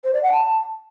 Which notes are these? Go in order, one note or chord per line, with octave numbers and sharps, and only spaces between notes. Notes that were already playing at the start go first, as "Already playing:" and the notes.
C5
D5
F#5
A5